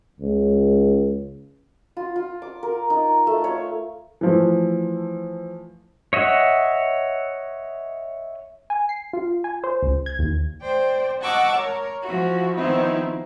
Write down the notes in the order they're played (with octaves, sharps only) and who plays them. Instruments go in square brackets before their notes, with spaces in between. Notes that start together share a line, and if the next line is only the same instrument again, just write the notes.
[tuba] C#2
[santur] F4
F4
D6
A#4
D#4
A3
C#5
[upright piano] E3 F3 A3
[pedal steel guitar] C#5 D#5 E5 F#5
[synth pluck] G#5
C7
F4
G#5
C5
C#2
G#6
D#2
[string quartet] C5 D5 G5
D#5 F#5 A5 C#6 D6 E6
A#4 C#5
F3 E4 F#4
D#3 F3 B3 C4 D#4 E4